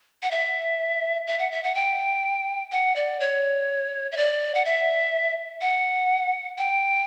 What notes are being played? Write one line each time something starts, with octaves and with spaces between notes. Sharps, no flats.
F#5
E5
E5
F#5
E5
F#5
G5
F#5
D5
C#5
E5
D5
F#5
E5
F#5
G5